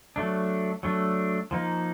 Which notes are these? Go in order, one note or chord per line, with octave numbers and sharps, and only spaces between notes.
F#3 A3 D4
F#3 A3 D4
F3 A#3 D#4